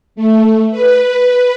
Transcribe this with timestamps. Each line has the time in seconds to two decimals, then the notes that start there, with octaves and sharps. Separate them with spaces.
0.16 A3
0.71 B4